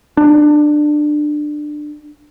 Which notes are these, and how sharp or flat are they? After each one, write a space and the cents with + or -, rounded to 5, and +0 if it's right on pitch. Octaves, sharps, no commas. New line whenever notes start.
D4 +20